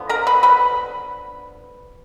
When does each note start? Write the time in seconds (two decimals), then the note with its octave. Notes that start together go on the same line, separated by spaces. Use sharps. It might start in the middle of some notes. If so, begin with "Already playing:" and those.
Already playing: D3 F3 B3
0.09 A#4 A#5
0.27 B4 B5
0.43 B4 B5